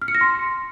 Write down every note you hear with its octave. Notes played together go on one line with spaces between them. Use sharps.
F6
C#7
A#6
C6